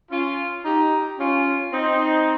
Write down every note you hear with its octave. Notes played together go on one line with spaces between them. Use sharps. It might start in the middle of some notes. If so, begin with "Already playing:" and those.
C#4 F4
D#4 G4
C#4 F4
C4 D#4